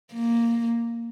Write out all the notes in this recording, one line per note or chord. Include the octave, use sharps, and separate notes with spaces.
A#3